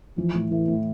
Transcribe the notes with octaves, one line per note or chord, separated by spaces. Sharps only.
E3 F3
A2
E3 A3
A2